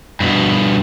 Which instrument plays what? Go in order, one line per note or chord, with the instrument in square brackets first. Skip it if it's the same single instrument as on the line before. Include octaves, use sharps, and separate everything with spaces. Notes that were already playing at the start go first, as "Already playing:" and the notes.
[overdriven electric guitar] G2 B2